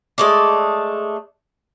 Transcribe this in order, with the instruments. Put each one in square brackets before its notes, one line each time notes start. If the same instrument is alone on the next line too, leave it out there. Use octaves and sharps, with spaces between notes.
[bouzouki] G#3 A3 D5